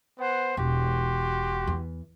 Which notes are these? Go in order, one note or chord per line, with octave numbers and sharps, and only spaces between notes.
B3 C5 F#5
E1 F#4 G4 C6
E2